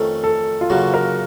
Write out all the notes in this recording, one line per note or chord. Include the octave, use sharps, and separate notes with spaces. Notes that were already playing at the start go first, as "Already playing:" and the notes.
Already playing: F2 D#3 A3 C#4 A4
A4
F4
F#2 C#3 F#3 A#3 C#4 F#4
A#4